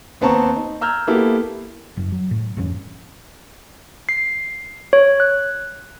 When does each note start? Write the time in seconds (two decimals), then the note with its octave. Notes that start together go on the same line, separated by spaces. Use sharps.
0.21 D#2 B3 C4 A5 A#5 C#6
0.56 D#4
0.81 A#5 E6 F6 G6 G#6
1.07 A#3 B3 E4 G4 A4
1.97 F#1 F#2
2.12 F#3
2.31 A2
2.57 G1 F2 C#4
4.09 C7
4.93 C#5
5.20 F#6